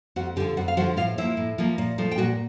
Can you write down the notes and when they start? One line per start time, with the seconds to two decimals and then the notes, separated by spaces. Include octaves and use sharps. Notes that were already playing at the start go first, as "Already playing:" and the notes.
0.16 F2 F#4 F#5
0.36 D3 F3 G4 G5
0.57 F2 F#4 F#5
0.68 F5
0.77 F3 F#4 F#5
0.80 D3
0.97 A2 F4 F5
1.18 F3 A#3 E4 E5
1.37 A2
1.58 F3 A#3
1.78 A#2
1.98 F3 A3
2.11 G5
2.18 A#2 F#4 F#5